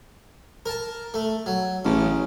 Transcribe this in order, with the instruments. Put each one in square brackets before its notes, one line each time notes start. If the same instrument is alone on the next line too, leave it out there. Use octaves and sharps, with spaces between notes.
[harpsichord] A#4 A5
A3
F#3
[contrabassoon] A1 [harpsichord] C#3